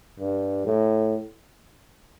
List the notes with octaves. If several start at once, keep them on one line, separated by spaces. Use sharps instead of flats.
G2
A2